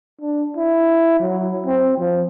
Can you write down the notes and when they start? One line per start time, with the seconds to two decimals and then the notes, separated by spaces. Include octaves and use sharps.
0.21 D4
0.57 E4
1.20 F#3
1.66 C4
1.98 F3